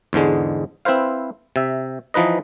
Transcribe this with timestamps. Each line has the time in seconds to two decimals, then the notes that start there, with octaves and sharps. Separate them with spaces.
0.13 E2 G#2 D3 G#3
0.85 C4 E4 B4 C5 F5
1.56 C3 E5
2.14 E3 F3 D#4 B4 D#5